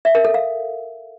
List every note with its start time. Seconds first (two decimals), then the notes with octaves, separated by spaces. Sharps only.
0.05 E5
0.15 A#4
0.25 A4
0.34 F5